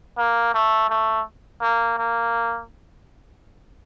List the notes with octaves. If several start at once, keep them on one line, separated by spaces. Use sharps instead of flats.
A#3
A3
A3
A#3
A#3